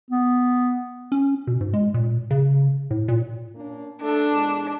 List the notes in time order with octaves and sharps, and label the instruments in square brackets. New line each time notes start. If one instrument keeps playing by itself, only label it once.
[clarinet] B3
[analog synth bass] C#4
B2
G#2
G#3
A#2
C#3
A2
A#2
[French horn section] A#3 C#4 D4
[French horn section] A3 A4 [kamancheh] D4
[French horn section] E2 A#2 G#3